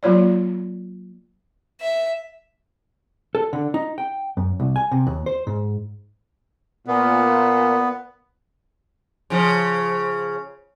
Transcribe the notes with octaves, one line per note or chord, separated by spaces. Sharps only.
F#3 A#3 F4 C#5 D5
E5
A4
D3
D#4
G5
F#2
C2
G#5
C3
D#2
C5
G#2
A#2 B3
C#3 F3